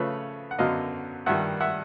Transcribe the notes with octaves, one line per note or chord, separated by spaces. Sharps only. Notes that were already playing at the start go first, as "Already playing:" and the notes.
Already playing: C#3 F3 A3 B4 C#5
F#5
F#2 D3 F#3 B3 D#5 F5
G2 D#3 G3 E5 F#5
E5 F#5